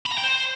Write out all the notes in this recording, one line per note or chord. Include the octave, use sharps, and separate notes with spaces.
B5
A#5
G5
C5